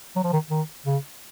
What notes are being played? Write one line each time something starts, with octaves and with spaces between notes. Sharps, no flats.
F#3
F3
D#3
D#3
C#3